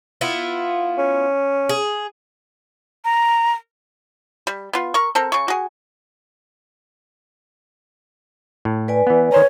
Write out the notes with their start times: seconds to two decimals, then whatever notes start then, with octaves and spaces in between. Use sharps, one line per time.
0.21 B3 E4 F4
0.98 C#4
1.69 G#4
3.05 A#5
4.47 G3
4.73 B3 F4
4.94 A#4 C#6
5.15 C4 A4 A#4
5.32 C#3 C#6
5.48 F#4 G#4
8.65 A2
8.88 B4 D5 G#5
9.07 E3 B3
9.32 D#3 C5 C#5 A#5